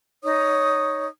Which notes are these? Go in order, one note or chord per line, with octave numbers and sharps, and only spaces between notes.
D#4 C#5 D#6